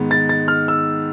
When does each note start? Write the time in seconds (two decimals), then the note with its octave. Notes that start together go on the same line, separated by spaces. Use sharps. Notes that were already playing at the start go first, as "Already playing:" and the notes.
Already playing: G#2 D#3 G#3 B3
0.11 A6
0.29 A6
0.48 F6
0.68 E6